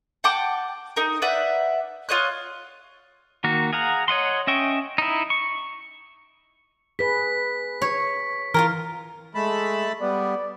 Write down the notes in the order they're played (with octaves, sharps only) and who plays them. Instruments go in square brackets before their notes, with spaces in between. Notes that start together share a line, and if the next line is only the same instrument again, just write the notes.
[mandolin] F#5 G5 A5 D6
D#4 A#4
B4 D5 E5 F#5
F4 C#5 D#5 F#6
[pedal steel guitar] D#3 A#3 F#4
G#4 F5 F#5 A#5
C#5 D#5 F#5 C6
C#4 D#5 E5 G5 C#6
D#4 E4
C#6
[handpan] G#4 B4 [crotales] B6
[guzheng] C#5
[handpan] E3 [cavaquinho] F4 G#4 A#4 [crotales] F6
[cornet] G#3 [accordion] A3 A5 B5
[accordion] G3 B3 [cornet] D5